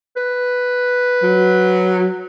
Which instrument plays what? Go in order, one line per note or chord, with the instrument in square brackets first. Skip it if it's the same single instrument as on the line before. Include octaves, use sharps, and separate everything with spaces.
[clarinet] B4
[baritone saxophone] F#3